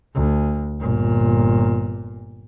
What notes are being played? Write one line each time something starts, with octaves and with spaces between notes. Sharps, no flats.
D2
G1 A#2